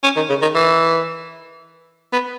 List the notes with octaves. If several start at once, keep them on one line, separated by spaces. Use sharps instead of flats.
C#4
D#3
C#3
D#3
E3
B3